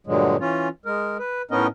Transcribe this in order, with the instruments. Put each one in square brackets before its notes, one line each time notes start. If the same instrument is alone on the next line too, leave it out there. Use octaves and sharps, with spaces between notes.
[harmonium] G2 A#2 D3 F#3 G#3
E3 C#4 F4
G#3 A#4
B4
A2 B3 C#4 D#4 A#4 D#5